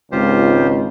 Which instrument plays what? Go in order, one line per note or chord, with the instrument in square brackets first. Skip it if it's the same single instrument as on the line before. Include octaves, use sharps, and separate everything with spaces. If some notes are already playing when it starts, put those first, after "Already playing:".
[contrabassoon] G#1 [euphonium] C#2 [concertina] F4 G4 C5